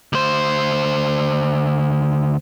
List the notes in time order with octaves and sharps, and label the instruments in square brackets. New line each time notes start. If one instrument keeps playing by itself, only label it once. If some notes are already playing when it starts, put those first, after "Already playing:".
[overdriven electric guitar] D2 C5